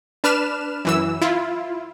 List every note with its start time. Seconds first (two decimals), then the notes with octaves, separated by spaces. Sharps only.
0.24 D4 B4 F6 E7
0.85 F#2 E3 E6
1.21 E4 F4